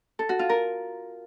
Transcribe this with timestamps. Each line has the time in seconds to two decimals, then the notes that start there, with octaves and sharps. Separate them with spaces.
0.19 A4
0.29 F#4
0.39 F4
0.49 A#4